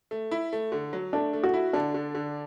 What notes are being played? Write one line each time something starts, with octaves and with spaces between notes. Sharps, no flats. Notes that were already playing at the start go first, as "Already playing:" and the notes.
A3
E4
A3
D3
F#3
A3 D4
A3
F#4
E4
D3 D4
D3
D3